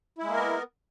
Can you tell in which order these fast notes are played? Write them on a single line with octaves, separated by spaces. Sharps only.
E4 G#3 A#3 A#4 B3